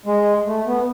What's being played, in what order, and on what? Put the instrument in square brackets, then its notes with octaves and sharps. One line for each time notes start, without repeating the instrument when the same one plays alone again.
[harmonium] G#3
A3
B3